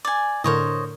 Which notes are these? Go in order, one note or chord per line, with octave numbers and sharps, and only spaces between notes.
D5 G#5
A2 D3 A#4 C5 C#5 D#5